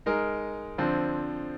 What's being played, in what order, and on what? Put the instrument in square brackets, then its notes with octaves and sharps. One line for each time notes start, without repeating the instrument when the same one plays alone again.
[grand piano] G#3 D#4 A#4
D3 F3 C4